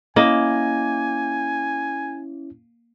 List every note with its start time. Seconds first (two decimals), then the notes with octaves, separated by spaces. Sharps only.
0.16 A#3 C#4 E4 D#5 G#5